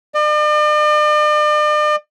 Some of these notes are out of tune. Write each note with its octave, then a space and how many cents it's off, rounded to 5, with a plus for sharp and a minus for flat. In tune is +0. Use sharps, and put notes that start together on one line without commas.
D5 +45